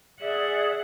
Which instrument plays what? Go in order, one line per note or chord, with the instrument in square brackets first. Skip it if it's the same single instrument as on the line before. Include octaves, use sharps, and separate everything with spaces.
[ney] G#4 [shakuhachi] D5 [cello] E5 F#5